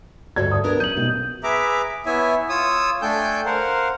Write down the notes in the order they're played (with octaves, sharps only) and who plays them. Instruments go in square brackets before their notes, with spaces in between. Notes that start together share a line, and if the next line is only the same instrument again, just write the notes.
[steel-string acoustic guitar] D2 G2 A4 [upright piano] F#4 D5 G#6
[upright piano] D#6
[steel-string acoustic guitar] B3 D4 A#4
[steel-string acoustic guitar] F#3 C#4 [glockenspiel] G6 F#7 [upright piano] D#7
[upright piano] B1 [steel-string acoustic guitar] D#4
[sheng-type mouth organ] G#4 B4 E5 A#5 D6
B3 E4 C#5 E5 G#5
F4 C#5 D#6 E6
A3 D4 A4 G5 G#5 G6
A#4 C5 F5 F#5